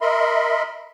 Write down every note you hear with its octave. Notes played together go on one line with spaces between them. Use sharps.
A#4 D#5 E5 B5 C6